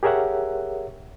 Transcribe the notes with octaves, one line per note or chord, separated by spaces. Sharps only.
G4 G#4 A#4 C#5 E5 F#5